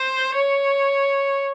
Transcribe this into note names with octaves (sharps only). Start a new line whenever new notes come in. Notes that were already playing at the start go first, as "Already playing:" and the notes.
Already playing: C5
C#5